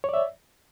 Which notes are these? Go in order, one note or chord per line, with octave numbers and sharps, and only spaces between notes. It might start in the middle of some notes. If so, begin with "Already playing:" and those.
C#5 D5 E5